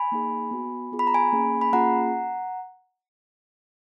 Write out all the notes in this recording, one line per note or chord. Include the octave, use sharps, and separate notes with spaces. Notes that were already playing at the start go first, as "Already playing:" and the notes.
Already playing: G#5 B5
A#3 D#4 G#4
B3 F#4
B3 F4 G#4
B5
A#5
G#5 B5
A#3 C#4 G#4
B5
A#3 C#4 F4 G#4 F#5 A#5